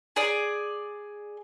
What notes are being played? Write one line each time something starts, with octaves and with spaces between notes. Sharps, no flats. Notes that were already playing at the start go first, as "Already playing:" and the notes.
G#4 D5